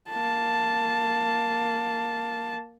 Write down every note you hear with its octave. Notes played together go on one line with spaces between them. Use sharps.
A#3 A5